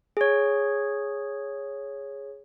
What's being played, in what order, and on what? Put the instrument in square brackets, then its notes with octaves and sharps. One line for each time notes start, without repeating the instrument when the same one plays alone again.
[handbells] G#4 C#5